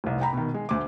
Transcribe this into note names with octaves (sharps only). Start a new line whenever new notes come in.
F1 C2
G5 A#5 B5
B2 D#3
G#3
D2 D6